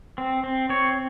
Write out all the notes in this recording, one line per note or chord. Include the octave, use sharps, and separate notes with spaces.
C4
C4
C4 C#5